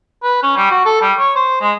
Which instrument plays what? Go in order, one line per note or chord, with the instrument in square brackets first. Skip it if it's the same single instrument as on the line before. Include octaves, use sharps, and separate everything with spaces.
[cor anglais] B4
C#4
G3
F#4
A4
G3
C#5
C5
G#3